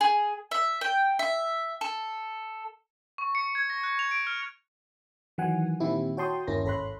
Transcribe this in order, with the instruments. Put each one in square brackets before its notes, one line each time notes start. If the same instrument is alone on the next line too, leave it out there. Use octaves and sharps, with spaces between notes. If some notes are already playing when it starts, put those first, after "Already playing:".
[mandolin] G#4
E5
G5
E5
A4
[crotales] C#6
C#7
G#6
A#6
F#6
F7
D7
F6
[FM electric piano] D#3 E3 F#3 F#5 G#5
A#2 D#3 C4 E4 G4
F#4 C#5 G5 A5 C6 D#6
G1 D#2 C#4 E4 A#4 A#6
G#1 A4 C#5 B5 C6 F#6